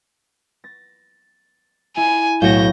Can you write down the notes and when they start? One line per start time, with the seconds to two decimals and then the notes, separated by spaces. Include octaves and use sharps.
0.64 A6 A#6
1.97 E4 G#5
2.42 B1 A2 F#3 F#4 F5 G6 A#6